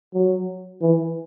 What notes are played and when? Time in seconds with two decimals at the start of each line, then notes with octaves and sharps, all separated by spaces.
0.14 F#3
0.81 E3